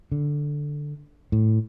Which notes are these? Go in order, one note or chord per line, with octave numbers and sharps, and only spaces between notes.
D3
A2